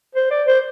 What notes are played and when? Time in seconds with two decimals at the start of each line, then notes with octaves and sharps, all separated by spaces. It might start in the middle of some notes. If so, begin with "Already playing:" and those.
0.15 C5
0.31 D5
0.47 C5